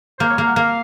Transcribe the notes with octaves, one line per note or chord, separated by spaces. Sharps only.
A#3 C5
C#5
A#3 F5
F#5
A#3 F5